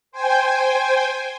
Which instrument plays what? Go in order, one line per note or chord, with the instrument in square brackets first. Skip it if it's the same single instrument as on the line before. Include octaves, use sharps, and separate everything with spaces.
[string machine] C5 G5 G#5